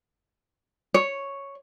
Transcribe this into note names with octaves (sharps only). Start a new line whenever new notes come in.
C#5